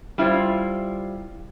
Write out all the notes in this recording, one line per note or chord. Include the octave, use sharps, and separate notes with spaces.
G3 E4 F4 C5